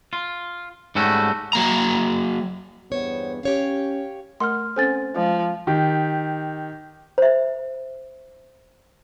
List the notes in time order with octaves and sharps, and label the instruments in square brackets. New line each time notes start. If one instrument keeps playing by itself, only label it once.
[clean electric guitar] F4
G#2 G3 A3 C#4 F#4
[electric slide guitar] F#3 A#3 A#5
[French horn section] E2 G2 B3 [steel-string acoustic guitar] C5 C#5
[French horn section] C#4 [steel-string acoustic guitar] G4 C#5 F5
[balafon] A3 A#4 F#5 [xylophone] C6 F6
[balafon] C4 C#4 A4 [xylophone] C5 G#5 A6
[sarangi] F3 [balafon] G#3
[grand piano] D#3 G4
[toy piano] C5 E5